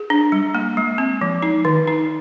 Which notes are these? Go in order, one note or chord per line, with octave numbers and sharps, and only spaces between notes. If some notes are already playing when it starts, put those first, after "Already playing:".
Already playing: G#4
D4
G3
A#3
G#3
C4
F3
D#4
D#3
D#4